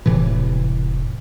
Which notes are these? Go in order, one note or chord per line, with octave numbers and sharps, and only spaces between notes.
E1 A2 C3 E3